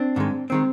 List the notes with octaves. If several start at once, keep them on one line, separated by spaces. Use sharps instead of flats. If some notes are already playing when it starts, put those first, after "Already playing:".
Already playing: C4 D4
G#2 D#3 G#3
D#3 G#3 C4